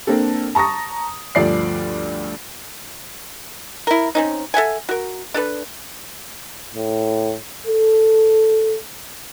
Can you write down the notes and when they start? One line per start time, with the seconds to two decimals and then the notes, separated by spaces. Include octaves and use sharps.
0.07 A#3 C4 D4 A4
0.55 A5 A#5 C#6 D#6 A#6
1.35 D2 G2 F3 D5 C7
3.87 E4 A#4
4.15 C4 C#4 D#4
4.54 A4 E5 F#5 G#5
4.89 F#4 A#4
5.34 D4 A4 B4
6.75 A2
7.67 A4